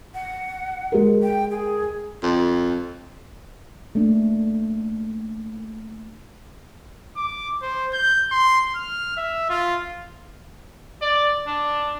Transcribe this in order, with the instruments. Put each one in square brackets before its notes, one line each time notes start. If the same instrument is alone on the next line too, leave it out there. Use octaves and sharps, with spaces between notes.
[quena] F#5
[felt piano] G#3 A#4
[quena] G5
G#4
[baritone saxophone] F2
[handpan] A3 A#3 D4
[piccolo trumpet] D6
C5
G6
C6
F6
E5
F4
[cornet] D5
D4